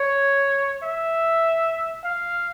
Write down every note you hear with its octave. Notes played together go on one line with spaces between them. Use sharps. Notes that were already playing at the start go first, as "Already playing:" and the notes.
Already playing: C#5
E5
F5